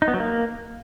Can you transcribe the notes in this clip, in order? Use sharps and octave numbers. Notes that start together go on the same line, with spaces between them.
D#4
B3
F#3
A#3